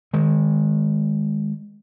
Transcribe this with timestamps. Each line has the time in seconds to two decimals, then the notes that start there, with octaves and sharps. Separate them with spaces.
0.13 D#3 G#3